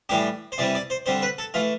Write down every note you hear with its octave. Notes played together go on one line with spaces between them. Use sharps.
A2 E3 G3 D4 G4
C5
C3 E3 G3 C4 D5
D5
C5
D3 G3 C4 C5
B4
A4
E3 A3 F4